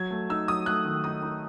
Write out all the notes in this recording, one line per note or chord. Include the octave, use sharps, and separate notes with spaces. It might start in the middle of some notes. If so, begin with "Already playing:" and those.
Already playing: F#3 G#6
A3
D#4 E6
F#3 D#6
A3 F#6
D#3
D#4 D#6
D#4